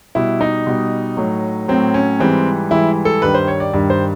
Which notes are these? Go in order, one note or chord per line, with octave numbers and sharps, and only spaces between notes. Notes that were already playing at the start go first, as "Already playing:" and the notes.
B2 G3 E4
D#4
B2 G3
A2 F#3
A2 F#3 C4
C#4
G#2 E3 G3 C4
G#2 E3 G3 E4
A4
G2 D#3 G3 B4
C5
C#5
D5
G2 D#3 G3
C5